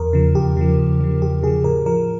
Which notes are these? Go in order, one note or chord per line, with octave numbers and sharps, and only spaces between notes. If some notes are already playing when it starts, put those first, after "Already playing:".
Already playing: E2 A#4
C#3 F3
E2 G4
C#3 F3
E2
C#3 F3
E2 G4
C#3 F3 G#4
A2 A#4
F3 A#4